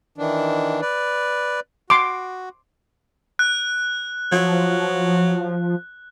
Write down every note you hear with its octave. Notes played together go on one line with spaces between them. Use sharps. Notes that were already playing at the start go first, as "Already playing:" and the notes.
D#3 E3 D4
B4 D5
F#4 C6 D6
F#6
F3 F#3